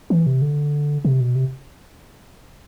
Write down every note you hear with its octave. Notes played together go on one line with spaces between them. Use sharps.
E3
C3
D3
C3
B2
C3